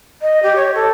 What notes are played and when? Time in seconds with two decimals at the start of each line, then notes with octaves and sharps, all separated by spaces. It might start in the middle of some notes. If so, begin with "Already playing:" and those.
0.22 D#5
0.43 G4
0.56 C#5
0.74 A4